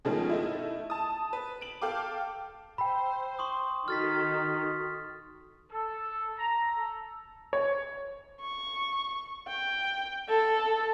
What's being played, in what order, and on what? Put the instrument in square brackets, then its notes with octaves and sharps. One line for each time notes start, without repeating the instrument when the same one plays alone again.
[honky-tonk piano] B2 D#3 F3 G#3 A3 C#4
A3 D#4 E4
A5 D#6
B4
D7 F#7
A4 F5 G5 D6
[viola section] C5 [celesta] G5 B5 [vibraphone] E6
[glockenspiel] C6 C#6 D#6
[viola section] D#3 [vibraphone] F#4 A4 D#6 [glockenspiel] F6 A6 B6
[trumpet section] A4
A#5
A4
[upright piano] C#5
[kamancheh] C#6
G5
A4